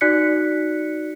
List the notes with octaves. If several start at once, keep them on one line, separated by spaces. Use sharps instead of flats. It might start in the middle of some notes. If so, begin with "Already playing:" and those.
D#4 F#4 D5 F#6 B6 C#7